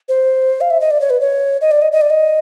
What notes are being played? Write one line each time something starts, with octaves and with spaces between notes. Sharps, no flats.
C5
F5
E5
D#5
D5
C#5
B4
C#5
D#5
D5
D#5
D#5
D5
D#5